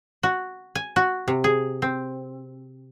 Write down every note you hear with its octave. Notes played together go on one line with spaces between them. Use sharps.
F#4
G#5
F#4
C3
G#4
C4